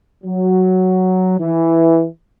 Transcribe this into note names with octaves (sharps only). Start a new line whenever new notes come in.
F#3
E3